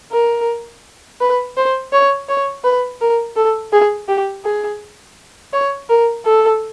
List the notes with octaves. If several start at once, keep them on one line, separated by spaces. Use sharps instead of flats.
A#4
B4
C5
C#5
C#5
B4
A#4
A4
G#4
G4
G#4
C#5
A#4
A4